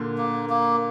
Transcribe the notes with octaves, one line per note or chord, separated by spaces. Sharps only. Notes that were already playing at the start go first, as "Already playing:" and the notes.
Already playing: A#2 D3
A#3
A#3